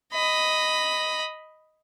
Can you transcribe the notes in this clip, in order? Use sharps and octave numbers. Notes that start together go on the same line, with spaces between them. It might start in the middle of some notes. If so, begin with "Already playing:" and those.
D#5 B5